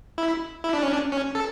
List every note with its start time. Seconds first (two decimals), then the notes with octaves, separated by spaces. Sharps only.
0.18 E4
0.64 E4
0.73 D4
0.83 C#4
0.92 D4
1.12 C#4
1.35 A4